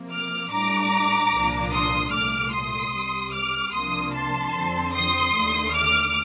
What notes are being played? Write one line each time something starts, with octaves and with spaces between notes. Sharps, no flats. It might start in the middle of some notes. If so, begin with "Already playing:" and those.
Already playing: C3 F3 A#3
D6 F6
A2 G3 D4 A#5 D6
C2 A#2 F3 A#3 D4
C6 D#6
C2 A#2 A3 D6 F6
C6 D#6
C2 C3 G3
D6 F6
C2 C3 F3 A#3 D4 C6 D#6
A5 C6
F2 D3 F3 C4
C6 D#6
D#2 D3 A3
D6 F6